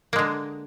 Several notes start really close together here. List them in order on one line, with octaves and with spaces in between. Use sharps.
A#3 G#3 D3